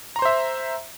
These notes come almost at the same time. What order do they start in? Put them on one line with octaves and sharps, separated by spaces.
A#5 C6 C5 E5